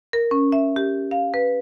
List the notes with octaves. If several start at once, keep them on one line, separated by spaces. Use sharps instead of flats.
A#4
C#4
E5
G4
F5
B4